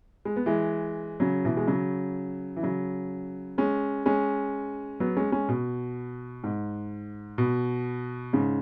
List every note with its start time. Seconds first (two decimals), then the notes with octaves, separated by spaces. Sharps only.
0.25 G#3
0.36 B3
0.46 E3 G#3
1.20 C#3 F#3
1.45 B2 E3
1.57 G#3
1.67 C#3 F#3
2.56 E3
2.63 C#3 F#3
3.58 G#3 C#4
4.06 G#3 C#4
5.00 F#3 B3
5.17 G#3 C#4
5.32 G#3 C#4
5.49 B2
6.44 G#2
7.38 B2
8.33 G#2 C#3